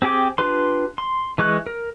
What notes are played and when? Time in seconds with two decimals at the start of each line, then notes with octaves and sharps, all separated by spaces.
0.02 C4 G4 G#4 G5 D6
0.38 D4 F4 G4 B4 C6
0.98 C6
1.38 E3 G#3 C#6 F#6
1.67 A#4